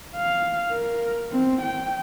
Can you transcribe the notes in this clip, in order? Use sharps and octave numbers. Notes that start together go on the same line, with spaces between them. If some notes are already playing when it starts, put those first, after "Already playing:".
F5
A#4
C4
G5